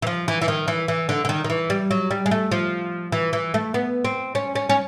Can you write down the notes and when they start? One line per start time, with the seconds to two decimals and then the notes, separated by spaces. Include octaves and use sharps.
0.02 E3
0.07 F3
0.28 E3
0.41 E3
0.48 D#3
0.68 E3
0.88 E3
1.09 D3
1.25 D3
1.29 D#3
1.44 D#3
1.50 E3
1.70 G3
1.91 F#3
2.11 G3
2.26 G#3
2.31 A3
2.52 F3
3.12 E3
3.33 E3
3.54 A3
3.74 B3
4.05 C4
4.35 C#4
4.55 C#4
4.69 C#4